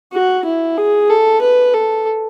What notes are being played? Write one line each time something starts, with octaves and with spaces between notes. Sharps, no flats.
F#4
E4
G#4
A4
B4
A4